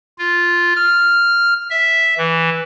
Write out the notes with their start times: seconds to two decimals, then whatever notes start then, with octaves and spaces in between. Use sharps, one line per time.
0.18 F4
0.76 F6
1.70 E5
2.18 E3